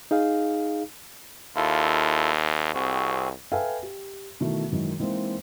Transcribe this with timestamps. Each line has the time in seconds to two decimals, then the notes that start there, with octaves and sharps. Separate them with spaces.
0.11 D#4 G#4 F5
1.56 D#2 E4 F4 A4
2.74 C2 C4 F#4 G#4
3.52 A4 B4 E5 F5 G5 G#5
3.83 G4
4.40 B2 D#3 E3 A3
4.71 F#2 D#3 E3 G#3
5.00 E3 G#3 A#3 C4 D#4